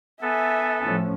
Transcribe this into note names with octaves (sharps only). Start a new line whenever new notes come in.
B3 A4 E5 G#5
A2 F3 C#4